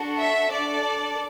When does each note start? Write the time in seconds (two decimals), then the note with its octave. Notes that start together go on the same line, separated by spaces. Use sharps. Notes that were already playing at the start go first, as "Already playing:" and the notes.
Already playing: D4 F#4 A4
0.19 E5
0.51 D4 A4 D5